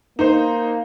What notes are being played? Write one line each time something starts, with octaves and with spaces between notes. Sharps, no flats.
A#3 D#4 C5